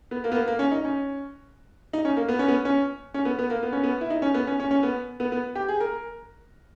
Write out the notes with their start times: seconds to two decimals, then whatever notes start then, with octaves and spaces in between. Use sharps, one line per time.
0.11 B3
0.24 A#3
0.32 B3
0.35 A#3
0.48 A#3
0.59 C#4
0.71 D#4
0.85 C#4
1.93 D#4
2.05 C#4
2.17 A#3
2.29 B3
2.39 C#4
2.48 B3
2.65 C#4
3.14 C#4
3.25 B3
3.39 B3
3.50 A#3
3.63 B3
3.72 C#4
3.84 B3
4.01 E4
4.10 D#4
4.22 C#4
4.34 B3
4.47 C#4
4.60 C#4
4.71 C#4
4.83 B3
5.20 B3
5.32 B3
5.55 G4
5.68 G#4
5.80 A#4